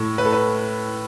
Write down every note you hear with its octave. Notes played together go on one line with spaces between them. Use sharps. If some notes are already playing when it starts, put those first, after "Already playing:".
Already playing: A2 A4
B4
A4
B4